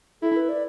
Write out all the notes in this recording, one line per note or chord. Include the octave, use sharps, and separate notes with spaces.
E4 A4
B4
D5